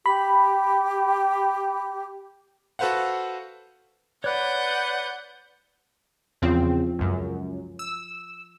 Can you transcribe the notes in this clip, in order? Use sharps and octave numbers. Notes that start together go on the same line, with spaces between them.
G4 B5
F#4 A4 B4 C5 F5 F#5
B4 C#5 D5 F#5 F#6 G6
E2 C#3 F3 C4 F4
C#2 F#2
E6